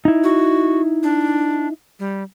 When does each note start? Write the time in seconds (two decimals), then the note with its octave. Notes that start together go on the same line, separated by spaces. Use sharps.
0.05 D#4 E4
0.24 F#4
1.03 D4
1.99 G3